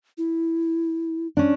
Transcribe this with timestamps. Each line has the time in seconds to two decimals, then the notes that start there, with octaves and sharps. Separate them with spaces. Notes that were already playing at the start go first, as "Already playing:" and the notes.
0.18 E4
1.37 C#4 D4